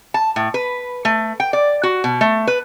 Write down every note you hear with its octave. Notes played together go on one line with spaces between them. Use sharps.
A5
A2
B4
A3
G5
D5
F#4
B2
A3
B4